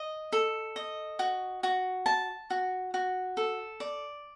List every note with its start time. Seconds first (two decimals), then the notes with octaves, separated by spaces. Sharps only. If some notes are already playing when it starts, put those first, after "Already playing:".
Already playing: D#5
0.32 A4
0.76 D#5
1.19 F#4
1.63 F#4
2.06 A5
2.50 F#4
2.94 F#4
3.37 A4
3.80 D5